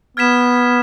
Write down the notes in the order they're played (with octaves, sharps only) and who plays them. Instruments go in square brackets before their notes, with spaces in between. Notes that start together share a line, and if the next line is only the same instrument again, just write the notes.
[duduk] B3 [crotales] F6 G#6 B6 E7